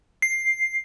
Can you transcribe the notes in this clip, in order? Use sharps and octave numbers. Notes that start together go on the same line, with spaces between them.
C7